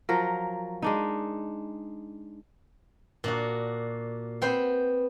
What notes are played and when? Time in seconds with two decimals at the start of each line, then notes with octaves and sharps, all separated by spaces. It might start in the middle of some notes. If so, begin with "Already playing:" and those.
0.09 F3 F#3 A#4
0.82 G#3 D4 D#4
3.24 A#2 D4 F#4
4.42 B3 C4 C5